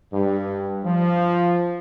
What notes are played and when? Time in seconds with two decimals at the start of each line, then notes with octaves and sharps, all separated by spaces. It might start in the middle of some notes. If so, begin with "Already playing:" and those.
0.11 G2
0.84 F3